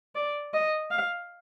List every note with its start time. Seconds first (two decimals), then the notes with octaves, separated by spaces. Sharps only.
0.15 D5
0.53 D#5
0.91 F5